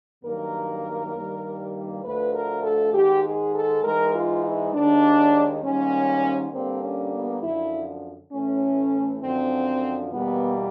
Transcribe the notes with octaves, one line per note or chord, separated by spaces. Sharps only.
G2 D#3 F#3 A#3 A#4
G2 D#3 G3 A#3
D2 D3 F3 A3 B4
A#4
A4
G#2 D#3 G#3 G4
G#4
A4
G#2 E3 G#3 A#4
F4
E4
D#2 D#3 G#3 D4
G#2 D#3 G3 A#3 C#4
G2 D3 G3 A#3 C4
C#4
B3
F#2 D3 F3 E4
A2 E3 A3 C#4
F#2 D3 F3 C4
E2 B2 G3 A#3 B3